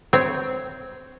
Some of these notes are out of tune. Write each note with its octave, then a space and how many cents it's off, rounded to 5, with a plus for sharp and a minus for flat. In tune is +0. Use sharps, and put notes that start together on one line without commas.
C4 -10 C#5 +0